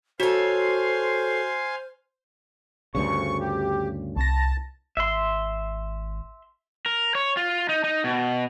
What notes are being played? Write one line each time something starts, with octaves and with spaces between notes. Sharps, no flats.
F#4 A4 C5 C#5 F5 G#5 C6
D2 G2 C#3 C#6
G4
C2 A5 A#6
G#1 E5 C6
A#4
C#5
F4
D#4
D#4
B2